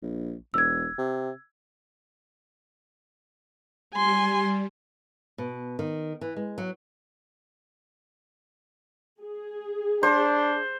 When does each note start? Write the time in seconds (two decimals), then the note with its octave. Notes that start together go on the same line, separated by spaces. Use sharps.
0.02 A#1
0.54 E1 E6 G#6
0.98 C3
3.94 G3 G#5 C6
5.38 B2
5.79 D#3
6.21 E3
6.36 G#3
6.58 F#3
9.21 G#4
10.03 D4 C5